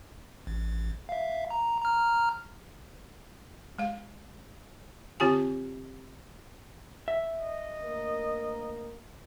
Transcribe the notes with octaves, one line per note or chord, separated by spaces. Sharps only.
A1
E5 F5
A#5
A#5 F6
G#3 F5
D3 C4 F4 G4 G#5
E5
D#5
D2 A#3 A#4